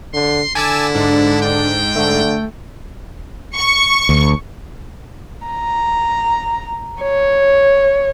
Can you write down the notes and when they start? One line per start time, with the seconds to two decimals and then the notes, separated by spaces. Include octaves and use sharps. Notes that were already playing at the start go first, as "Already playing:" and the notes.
0.14 D3 C6
0.55 D3 E4 G#5 A5 D6 E6
0.95 G#2 D4
1.42 G5
1.96 D3 A3
3.57 C#6
4.09 D2
5.47 A#5
7.02 C#5